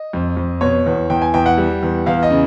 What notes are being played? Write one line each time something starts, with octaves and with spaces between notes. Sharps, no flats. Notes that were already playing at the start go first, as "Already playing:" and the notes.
Already playing: D#5
F2
F2
B2 C#5
E2
E2 G5
G#5
E2 G5
F#5
G3
E2
E2 F5
D#5
C#3